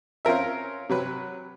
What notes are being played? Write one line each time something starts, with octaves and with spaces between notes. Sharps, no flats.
C4 C#4 F4 A#4 E5
C3 F#3 B4